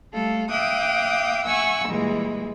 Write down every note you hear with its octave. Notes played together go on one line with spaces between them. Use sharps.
G3 A3 A4 F5
E5 F5 G5 D6 D#6 F#6
E5 F#5 G#5 C#6 E6
A#2 E3 G3 G#3